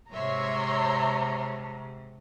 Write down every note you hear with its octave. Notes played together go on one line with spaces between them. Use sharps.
G#2 C3 C#5 E5 A#5 C6